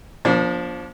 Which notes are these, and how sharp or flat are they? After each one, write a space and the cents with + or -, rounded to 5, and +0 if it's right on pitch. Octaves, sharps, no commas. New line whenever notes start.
F3 +10 A#3 +45 D4 -25